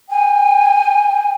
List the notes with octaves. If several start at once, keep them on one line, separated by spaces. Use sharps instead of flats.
G5 G#5